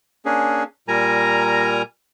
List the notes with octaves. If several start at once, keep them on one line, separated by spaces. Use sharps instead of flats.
A#3 C#4 D4 G#4
A#2 G3 A#4 G#5 A#5